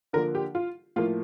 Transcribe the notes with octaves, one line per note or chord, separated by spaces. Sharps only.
D3 F3 A#3 A#4
G4
F4
A2 F3 A#3 F4